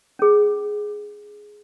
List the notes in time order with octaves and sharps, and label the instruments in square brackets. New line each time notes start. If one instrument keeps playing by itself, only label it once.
[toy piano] C#4 G#4